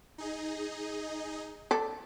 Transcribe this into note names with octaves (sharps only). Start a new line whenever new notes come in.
D#4 G#4 D#5
A4 D5